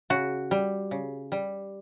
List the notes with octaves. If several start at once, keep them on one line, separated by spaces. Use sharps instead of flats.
C#3 F#4
G3
C#3
G3